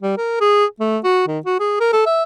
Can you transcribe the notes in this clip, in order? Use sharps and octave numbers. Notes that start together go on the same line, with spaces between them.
G3
A#4
G#4
A3
F#4
D#3
F#4
G#4
A#4
A4
E5